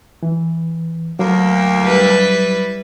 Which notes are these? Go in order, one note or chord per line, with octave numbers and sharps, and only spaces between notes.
E3
D2 F#3 A#3
G3 E4 B4